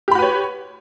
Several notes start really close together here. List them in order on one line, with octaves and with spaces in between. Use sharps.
G4 B5 F#4 B4 C#5